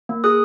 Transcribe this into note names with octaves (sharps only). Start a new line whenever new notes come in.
A#3
G#4 D#6 F#6